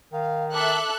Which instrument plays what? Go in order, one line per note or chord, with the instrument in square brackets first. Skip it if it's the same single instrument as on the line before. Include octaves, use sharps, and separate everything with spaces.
[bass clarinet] D#3 [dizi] F5
[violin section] A4 E5 F#6 [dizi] D6